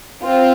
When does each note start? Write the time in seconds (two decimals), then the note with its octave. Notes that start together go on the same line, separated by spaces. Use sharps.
0.23 C4 F4